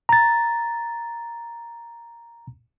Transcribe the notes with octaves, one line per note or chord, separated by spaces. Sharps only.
A#5 A6